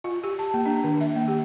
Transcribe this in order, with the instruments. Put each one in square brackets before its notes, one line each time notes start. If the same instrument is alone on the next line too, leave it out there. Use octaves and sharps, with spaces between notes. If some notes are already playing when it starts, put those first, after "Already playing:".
[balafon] F4
G4
A5
A#3
D4
D#3
E5
A#3
G4